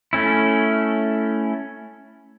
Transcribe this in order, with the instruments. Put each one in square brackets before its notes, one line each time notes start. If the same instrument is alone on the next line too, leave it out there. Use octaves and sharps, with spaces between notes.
[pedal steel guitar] A3 C#4 E4